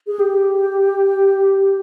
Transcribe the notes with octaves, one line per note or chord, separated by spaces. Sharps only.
G#4
G4